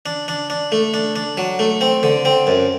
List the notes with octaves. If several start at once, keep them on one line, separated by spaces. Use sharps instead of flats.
D4
D4
D4
A3
D4
D4
F#3
A3
C4
D3
C4
F#2